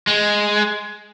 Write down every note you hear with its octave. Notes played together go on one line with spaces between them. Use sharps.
G#3